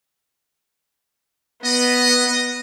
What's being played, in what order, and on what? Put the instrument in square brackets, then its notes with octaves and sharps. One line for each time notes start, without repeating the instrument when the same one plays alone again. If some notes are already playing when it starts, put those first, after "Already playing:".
[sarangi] B3 [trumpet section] D#5